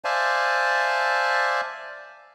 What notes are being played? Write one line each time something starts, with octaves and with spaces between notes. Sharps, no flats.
C5 D5 E5 F5 G#5 A5